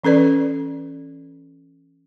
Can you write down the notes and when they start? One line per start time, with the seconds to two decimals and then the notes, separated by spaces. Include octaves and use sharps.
0.04 E3 C#4 A4 B4 D5